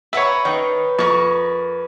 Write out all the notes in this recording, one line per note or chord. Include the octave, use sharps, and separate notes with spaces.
B4 C#5 E5 F#5 A#5
D#3 D#4 B4 C#5
F2 A#4 C#6